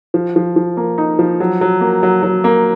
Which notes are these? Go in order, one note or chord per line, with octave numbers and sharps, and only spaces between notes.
F3
F3
F3
A#3
D#4
F3
F#3
F#3
A#3
F#3
F#3
A#3